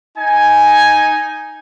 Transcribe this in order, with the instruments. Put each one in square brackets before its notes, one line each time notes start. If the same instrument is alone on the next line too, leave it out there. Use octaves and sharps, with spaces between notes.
[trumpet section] D#4 G#5